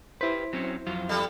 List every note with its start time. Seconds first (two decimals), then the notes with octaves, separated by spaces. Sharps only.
0.21 E4 G4 B4 C5
0.53 F#3 C4 C#4
0.87 F2 F#3 F4
1.08 C3 G3 A4